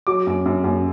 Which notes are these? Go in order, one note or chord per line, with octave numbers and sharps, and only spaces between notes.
F#3 D6
F#2
F#2
F#2